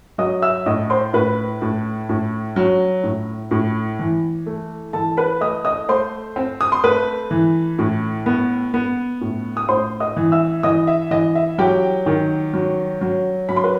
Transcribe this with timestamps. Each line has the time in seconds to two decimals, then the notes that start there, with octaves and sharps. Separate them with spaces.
0.18 F#3 D#5 D#6
0.42 E5 E6
0.66 A2 D#5 D#6
0.90 C5 C6
1.13 A2 B4 B5
1.62 A2
2.09 A2
2.56 F#3
3.04 A2
3.51 A2
3.99 E3
4.46 A3
4.93 E3 A4 A5
5.17 B4 B5
5.41 A3 D#5 D#6
5.65 D#5 D#6
5.88 A3 C5 C6
6.36 C4
6.61 D#6
6.72 C6
6.84 A3 B4 B5
7.31 E3
7.79 A2
8.26 B3
8.74 B3
9.21 A2
9.57 D#6
9.69 A2 C5 C6
10.00 D#5 D#6
10.17 E3
10.32 E5 E6
10.63 E3 D#5 D#6
10.87 E5
11.11 E3 D#5
11.35 E5
11.58 F#3 G4 G5
12.06 D#3
12.54 F#3
13.01 F#3
13.49 F#3 B5
13.56 C6
13.64 B4